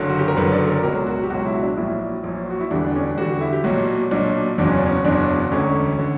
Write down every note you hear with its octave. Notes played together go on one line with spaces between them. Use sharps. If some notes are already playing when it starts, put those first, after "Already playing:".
Already playing: F#1 F#2 D3
F#4
G4
A#4
F#1 F#2 D3 B4
D5
A#4
C#2 B2 F#3 A#4
F#4
G4
C#2 B2 F#3 F#4
E4
D4
A#1 A#2 F#3 E4
A#1 A#2 F#3
F#4
E4
E2 D3 G3 D4
D4
C#4
D4
E2 D3 G3 F#4
F#4
E4
G4
B1 A#2 F#3 F#4
B1 A#2 F#3 D4
F#1 E2 B2 F#3 D4
C#4
C#4
F#1 E2 B2 F#3 D4
E1 D2 D3 C#4
D3